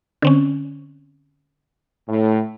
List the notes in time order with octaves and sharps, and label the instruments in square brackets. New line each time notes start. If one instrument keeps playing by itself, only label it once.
[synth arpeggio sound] D3 C4 C#4
[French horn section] A2